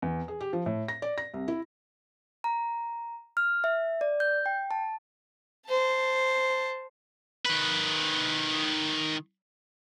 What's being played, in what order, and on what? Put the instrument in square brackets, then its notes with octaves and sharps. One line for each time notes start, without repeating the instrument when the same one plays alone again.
[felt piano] E2
G#4
G4
F3
A2
A#6
D5
A#6
C2
E4
[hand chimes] A#5
F6
E5
D5
G6
G5
A5
[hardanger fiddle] C5 A5
[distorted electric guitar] D#3 B4